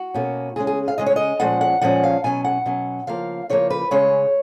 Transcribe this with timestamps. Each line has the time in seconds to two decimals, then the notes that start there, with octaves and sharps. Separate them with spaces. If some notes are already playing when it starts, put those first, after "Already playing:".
Already playing: F#4
0.14 B2 A#3 C#4
0.56 C#3 G#3 C#4 G#4
0.67 G#4
0.88 F5
0.98 C#3 G#3 C#4 D#5
1.06 C#5
1.16 D#5
1.40 A#2 F3 G#3 C#4 F#5
1.61 F#5
1.81 A#2 F3 G#3 C#4 F#5
2.04 F5
2.24 B2 F#3 C#4 G#5
2.44 F#5
2.66 B2 F#3 C#4
3.07 C#3 F3 A#3 F5
3.50 C#3 F3 A#3 C#5
3.70 B4
3.91 C#3 G#3 C#4 C#5